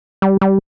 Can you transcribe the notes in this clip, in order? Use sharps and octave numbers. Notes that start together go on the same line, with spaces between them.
G3
G3